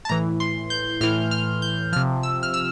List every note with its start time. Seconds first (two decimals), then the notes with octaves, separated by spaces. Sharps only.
0.05 A5
0.09 A2 E3 A#5
0.40 C6
0.70 G6
1.01 A2 E3 F6
1.31 F6
1.62 G6
1.92 C3 F3 F6
2.23 E6
2.43 F6
2.54 E6